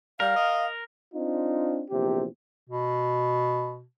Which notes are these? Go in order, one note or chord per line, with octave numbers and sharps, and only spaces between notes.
G3 A#4 F5
D#5
C4 D4 D#4 F4
A#1 E2 C3 G4
B2